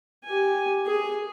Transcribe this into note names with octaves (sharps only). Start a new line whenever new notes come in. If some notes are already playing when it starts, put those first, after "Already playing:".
G4 G#5
G#4